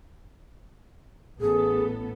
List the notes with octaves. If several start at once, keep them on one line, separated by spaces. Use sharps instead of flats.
A1 B3 G#4 A4